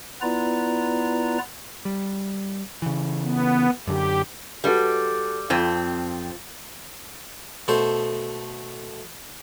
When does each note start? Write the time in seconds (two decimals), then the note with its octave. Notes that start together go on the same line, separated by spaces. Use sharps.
0.21 B3 E4 F4 B4 D5 A#5
1.85 G3
2.82 C#3 E3
3.24 B3
3.87 F#2 D3 G4
4.64 G3 F#4 A4 B4
5.50 F2 C4 F4
7.68 B2 A3 A4 C5